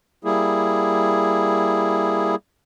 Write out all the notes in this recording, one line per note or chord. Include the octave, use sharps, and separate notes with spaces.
G3 A#3 E4 G#4